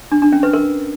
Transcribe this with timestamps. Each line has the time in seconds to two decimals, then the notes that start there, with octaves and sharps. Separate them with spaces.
0.12 D4
0.22 D4
0.32 C#4
0.43 B4
0.53 A#4